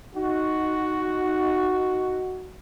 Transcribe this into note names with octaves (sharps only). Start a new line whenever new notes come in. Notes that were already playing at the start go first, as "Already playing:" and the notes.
D#4 F#4